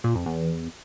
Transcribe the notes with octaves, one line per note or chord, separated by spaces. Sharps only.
A#2
F2
E2